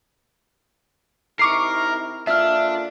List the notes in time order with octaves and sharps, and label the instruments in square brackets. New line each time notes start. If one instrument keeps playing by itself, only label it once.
[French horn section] C3 D#4 E4 [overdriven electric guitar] A#4 [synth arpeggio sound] C#6 D6 C7
[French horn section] D3 A#3 F4 [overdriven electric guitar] D4 [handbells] E5 F6